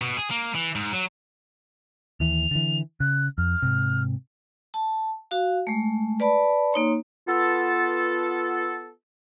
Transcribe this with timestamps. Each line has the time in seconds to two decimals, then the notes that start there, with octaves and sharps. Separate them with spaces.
0.01 B2
0.17 G#4
0.31 A#3
0.55 E3
0.75 G#2
0.93 F#3
2.20 D#2 E3 F7
2.51 D3 E3
3.00 C#3 F#6
3.38 F2 F6
3.62 G#2 C3
4.74 A5
5.31 F#4 F5
5.67 G#3 A3
6.20 B4 D5 A5 B5
6.73 A#3 D#4 C#5 C6
7.28 B3 F4 A4